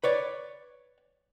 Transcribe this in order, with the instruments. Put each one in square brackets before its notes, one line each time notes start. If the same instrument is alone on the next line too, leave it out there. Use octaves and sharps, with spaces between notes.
[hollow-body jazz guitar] B4 C#5 D5